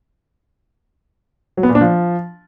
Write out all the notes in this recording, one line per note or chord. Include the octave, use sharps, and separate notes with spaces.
F#3
B3
A#2
D4
F3